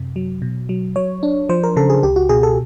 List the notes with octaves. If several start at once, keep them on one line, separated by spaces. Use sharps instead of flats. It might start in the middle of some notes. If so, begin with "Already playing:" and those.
Already playing: F#2 C3
F#3
B2
F#3
F#3 C#5
D4
F3 C5
A#4
C#3 A4
G#4
C#2 G4
F#4
B2 G#4
A4